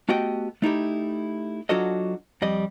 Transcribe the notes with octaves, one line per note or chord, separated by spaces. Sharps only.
A3 B3 F#4 G4 D#5 G5
A3 D#4 E4 G4
F#3 D4 F4 F#4 A4 D#5
F2 G3 D#5